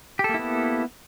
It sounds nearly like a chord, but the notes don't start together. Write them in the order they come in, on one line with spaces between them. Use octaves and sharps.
G4 A4 A#3 E4 B3